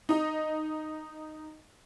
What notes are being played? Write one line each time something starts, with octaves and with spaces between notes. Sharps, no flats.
D#4 D#5